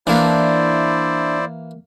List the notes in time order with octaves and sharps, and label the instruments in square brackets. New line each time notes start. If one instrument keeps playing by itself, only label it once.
[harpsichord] E3 A#3 [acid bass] D4 [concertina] E4 C5 D5